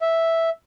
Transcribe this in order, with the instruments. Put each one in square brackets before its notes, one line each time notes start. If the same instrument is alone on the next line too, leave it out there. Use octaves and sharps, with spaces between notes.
[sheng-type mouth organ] E5